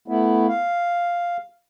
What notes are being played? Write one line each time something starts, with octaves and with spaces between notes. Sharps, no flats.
A3 B3 E4
F5